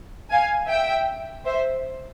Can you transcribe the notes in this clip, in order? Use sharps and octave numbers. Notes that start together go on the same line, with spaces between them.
F5 G#5
E5 G5
C5 E5